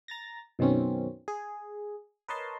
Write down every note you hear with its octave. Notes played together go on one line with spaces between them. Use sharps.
A#5 A6 A#6
F#2 B2 D#3 C4 C#4
G#4
A#4 B4 C#5 D#5 A5 C6